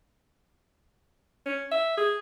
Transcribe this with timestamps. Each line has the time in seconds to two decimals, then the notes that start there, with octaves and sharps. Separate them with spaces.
1.46 C#4
1.71 E5
1.97 G#4